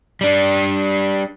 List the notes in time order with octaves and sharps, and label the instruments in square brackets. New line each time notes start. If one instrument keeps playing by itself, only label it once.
[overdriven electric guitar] G3 D4